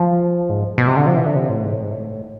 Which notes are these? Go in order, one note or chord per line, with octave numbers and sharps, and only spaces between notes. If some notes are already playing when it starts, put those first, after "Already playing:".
Already playing: F3
G#2
B2
C3
D3
F3
E3
D3
C3
A2
G#2
A2
G#2
A2